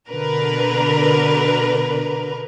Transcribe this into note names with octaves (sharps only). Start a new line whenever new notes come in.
B2 D3 A#4 B4